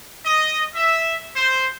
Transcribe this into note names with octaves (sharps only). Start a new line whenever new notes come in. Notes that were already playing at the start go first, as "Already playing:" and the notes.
D#5
E5
C5